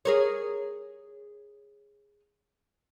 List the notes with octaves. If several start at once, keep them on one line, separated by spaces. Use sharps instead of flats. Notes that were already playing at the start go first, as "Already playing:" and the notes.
G#4 A#4 C#5